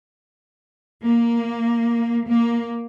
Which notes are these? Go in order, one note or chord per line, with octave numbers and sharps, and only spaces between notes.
A#3
A#3